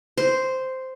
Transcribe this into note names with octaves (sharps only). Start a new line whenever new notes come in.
C5